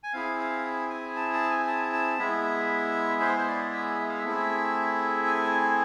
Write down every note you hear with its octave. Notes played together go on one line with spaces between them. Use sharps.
G#5
C4 E4 G#4 F5
F5
G#5
A5
A5
G#5
A5
A5
G#3 B3 E4 G#4 E5
C5
C5
D5
E5
E5
F5
E5
A3 C4 E4 G#4
G#5
G#5